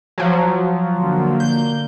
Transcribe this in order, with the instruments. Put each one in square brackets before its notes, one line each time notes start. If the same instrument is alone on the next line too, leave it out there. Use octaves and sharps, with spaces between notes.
[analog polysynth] F3 F#3
[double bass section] D3 A#3
[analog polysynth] G6